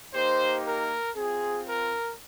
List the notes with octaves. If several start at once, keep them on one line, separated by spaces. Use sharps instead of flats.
A#3 D#4 G4 C5
A#4
C4 F4 G#4
A#4